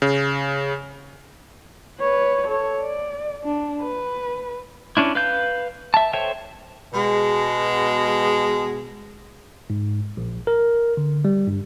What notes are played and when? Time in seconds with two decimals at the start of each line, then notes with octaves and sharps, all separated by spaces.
0.02 C#3
1.99 B4 C#5
2.48 A4 C#5
2.82 D5
3.44 D4
3.81 B4
4.97 C#4 D4 E4
5.15 B4 F5 G6
5.94 E5 A5
6.13 A4 C5 C#5 E5 G5
6.93 B2 G#3
9.70 G#2
10.17 A#1
10.47 A#4
10.97 D3
11.25 G3
11.47 G2